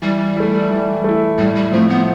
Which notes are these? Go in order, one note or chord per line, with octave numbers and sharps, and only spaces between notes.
E3 G3
A3 E4
E3
A3 E4
A2 G3
G3
F3 A3 C4
B3